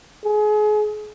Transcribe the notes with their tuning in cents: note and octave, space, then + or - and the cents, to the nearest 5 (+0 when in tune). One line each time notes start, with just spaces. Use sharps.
G#4 +30